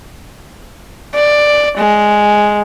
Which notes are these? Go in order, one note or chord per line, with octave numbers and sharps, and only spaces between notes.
D5
G#3